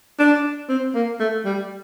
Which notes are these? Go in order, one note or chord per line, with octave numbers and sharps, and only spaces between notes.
D4
C4
A#3
A3
G3